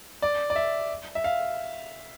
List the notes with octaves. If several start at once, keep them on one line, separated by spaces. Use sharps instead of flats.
D5
D5
E5
E5
F5